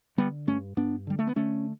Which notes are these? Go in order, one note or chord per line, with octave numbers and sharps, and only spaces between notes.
D3 G3 B3
G2 A3 C#4
G2 B3 D4
D3 G3
A3
B3
D3 A3 C#4